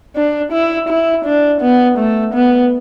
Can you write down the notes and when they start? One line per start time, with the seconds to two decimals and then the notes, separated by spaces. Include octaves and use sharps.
0.16 D4
0.52 E4
0.88 E4
1.25 D4
1.61 B3
1.98 A3
2.34 B3